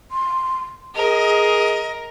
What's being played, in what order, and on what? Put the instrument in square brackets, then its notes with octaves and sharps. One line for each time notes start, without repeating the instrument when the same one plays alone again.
[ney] C6
[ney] G#4 [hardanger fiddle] A#4 [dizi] D#5